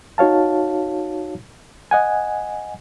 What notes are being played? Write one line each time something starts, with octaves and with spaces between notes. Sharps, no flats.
D#4 F#4 C#5 F5 A5
D#5 F#5 G#5